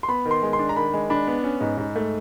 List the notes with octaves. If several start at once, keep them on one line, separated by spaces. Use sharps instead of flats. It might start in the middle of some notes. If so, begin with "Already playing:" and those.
C6
B3 B5
D#3
C6
G#3
C6
D4
A#5
D#3 B5
G#3
D4 B5
B3
C#4
G#2
G#2
A3